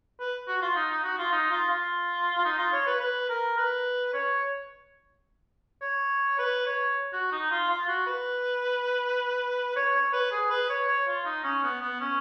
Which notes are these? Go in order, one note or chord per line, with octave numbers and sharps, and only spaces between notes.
B4
F#4
F4
D#4
D#4
F#4
F4
D#4
F4
F4
F4
D#4
F4
C#5
B4
B4
A#4
B4
C#5
C#5
B4
C#5
F#4
D#4
F4
F4
F#4
B4
C#5
C#5
B4
G#4
B4
C#5
C#5
F4
D#4
C#4
B3
B3
C#4